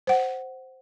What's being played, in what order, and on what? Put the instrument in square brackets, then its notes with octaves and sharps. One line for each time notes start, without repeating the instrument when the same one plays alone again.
[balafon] C5 F#5